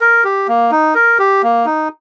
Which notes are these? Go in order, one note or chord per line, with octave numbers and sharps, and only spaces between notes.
A#4
G4
A#3
D#4
A#4
G4
A#3
D#4